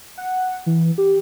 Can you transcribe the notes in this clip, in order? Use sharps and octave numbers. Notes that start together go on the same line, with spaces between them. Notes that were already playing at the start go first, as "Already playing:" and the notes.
F#5
E3
G4